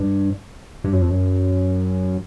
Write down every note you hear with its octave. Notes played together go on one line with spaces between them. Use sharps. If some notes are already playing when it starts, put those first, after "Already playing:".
Already playing: G2
G2
F#2
F2
F#2